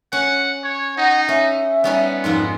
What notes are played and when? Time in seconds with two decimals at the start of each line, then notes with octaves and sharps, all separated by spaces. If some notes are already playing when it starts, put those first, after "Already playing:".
0.12 C#4 F#5
0.64 C#5
0.97 D#4 F#5
1.29 C#4 E5
1.84 G3 B3 C#4 D#4
2.24 F2 G#2 D#4 C5